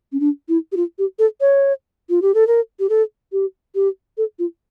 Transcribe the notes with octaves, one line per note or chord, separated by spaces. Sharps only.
C#4
D4
E4
G4
F4
G4
A4
C#5
F4
G4
A4
A#4
G4
A4
G4
G4
A4
F4